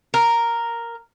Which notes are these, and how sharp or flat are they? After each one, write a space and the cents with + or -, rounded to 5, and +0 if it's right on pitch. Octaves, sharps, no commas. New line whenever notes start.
A#4 +0